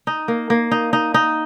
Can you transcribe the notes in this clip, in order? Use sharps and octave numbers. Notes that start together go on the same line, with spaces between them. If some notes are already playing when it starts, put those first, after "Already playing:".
D#4
A#3
A#3
D#4
D#4
D#4